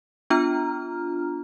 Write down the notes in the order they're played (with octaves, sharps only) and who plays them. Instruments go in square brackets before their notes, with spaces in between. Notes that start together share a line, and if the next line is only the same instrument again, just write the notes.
[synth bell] B3 D4 F4 A#5 F6